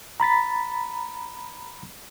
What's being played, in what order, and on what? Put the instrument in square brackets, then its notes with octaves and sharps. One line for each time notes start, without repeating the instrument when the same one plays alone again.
[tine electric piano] A#5 B5 A6 B6